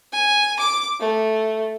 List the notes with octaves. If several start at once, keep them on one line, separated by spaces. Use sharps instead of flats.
G#5
D6
A3